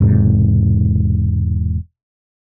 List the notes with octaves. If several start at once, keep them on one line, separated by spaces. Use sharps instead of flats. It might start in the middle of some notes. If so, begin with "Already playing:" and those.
E1 G#2 C3